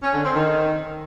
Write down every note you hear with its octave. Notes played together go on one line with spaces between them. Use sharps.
C#4
D3
C4
D#3